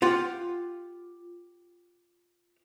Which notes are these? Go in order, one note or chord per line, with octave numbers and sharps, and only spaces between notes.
F4 G4 F#5